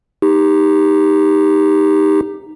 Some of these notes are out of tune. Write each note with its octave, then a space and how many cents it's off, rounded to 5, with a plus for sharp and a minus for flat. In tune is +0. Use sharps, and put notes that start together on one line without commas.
D#4 +0 G4 +15